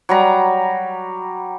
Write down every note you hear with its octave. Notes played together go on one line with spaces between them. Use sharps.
F#3 G3 A#5